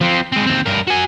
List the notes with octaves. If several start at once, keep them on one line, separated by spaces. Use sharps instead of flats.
F3 C4
G#3 C4
D#2 C4
G2 A#4
F#4 G#5